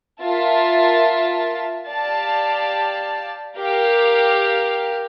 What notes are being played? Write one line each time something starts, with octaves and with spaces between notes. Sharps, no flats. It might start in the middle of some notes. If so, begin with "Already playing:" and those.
F4 A#4 E5 A5
G4 D5 F5 A5
G4 A#4 F5